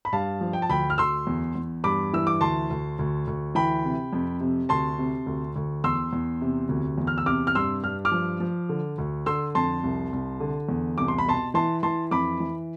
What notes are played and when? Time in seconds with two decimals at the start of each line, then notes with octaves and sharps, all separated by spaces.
0.05 B5
0.13 G2 F5 A5
0.41 F3
0.53 G5
0.62 A5
0.69 D2 G5 B5
0.90 F6
0.98 D2 C6 E6
1.27 E2
1.55 E2
1.84 G2 B5 D6
2.13 E3 E6
2.27 D6
2.41 D2 A5 C6
2.70 D2
2.99 D2
3.27 D2
3.55 E3 G5 B5
3.85 C3
4.13 F2
4.41 C3
4.69 D2 A5 C6
4.99 C3
5.26 D2
5.56 D2
5.84 E2 C6 E6
6.13 E2
6.41 C3
6.69 D2
6.98 E2
7.07 F6
7.18 E6
7.26 C3 D6 F6
7.47 F6
7.55 G2 C6 E6
7.84 G2 F6
8.05 D6 F6
8.12 F3
8.40 F3
8.69 D3
8.98 D2
9.26 D3 C6 E6
9.55 F2 A5 C6
9.83 C2
10.13 C2
10.40 D3
10.69 E2
10.98 C2 D6
11.08 C6
11.18 B5
11.26 B2 A5 C6
11.54 E3 A5 C6
11.83 E3 A5 C6
12.11 F2 B5 D6
12.40 E3